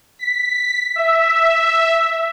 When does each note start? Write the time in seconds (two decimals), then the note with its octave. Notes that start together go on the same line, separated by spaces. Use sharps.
0.19 B6
0.95 E5